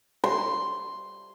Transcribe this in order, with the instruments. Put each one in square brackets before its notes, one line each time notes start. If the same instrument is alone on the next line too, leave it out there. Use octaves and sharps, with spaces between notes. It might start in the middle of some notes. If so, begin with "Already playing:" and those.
[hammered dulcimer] C6